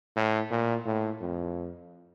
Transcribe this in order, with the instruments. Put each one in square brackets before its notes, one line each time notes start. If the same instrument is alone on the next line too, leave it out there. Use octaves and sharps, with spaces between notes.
[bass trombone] A2
A#2
A2
F2